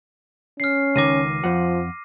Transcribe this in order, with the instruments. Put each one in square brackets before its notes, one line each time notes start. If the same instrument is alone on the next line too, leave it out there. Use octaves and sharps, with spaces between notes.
[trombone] C#4 [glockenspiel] F6 C7
[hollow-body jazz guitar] C#2 D#3 [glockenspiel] D6 A#6 D#7
[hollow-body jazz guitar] F2 F#5 [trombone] F3